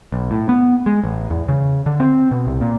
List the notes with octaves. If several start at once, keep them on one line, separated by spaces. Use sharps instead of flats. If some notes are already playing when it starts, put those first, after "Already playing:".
B1
A2
B3
G#3
A1
E2
C#3
D3
C4
B2
C2
A#2